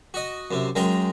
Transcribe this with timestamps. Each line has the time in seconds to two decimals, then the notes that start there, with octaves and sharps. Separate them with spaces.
0.14 F#4 D#5
0.51 F#2 C3
0.75 F#2 G#3 A#4 G5 A#5 C6